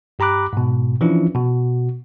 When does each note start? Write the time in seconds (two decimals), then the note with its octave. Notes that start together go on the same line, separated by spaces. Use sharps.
0.19 G2 G4 A#5 B5 D6 F#6
0.53 G#2 B2
1.01 E3 F3 C#4 D4 E4 F4
1.34 B2 F#4